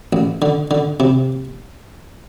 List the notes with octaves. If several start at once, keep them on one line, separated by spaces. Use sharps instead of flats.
A1
D3
D3
C3